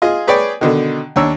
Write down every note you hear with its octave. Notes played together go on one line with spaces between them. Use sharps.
F4 G#4 D#5
G#4 B4 C#5 D5 G5
B2 D3 D#3
D#2 D4 C#5 E6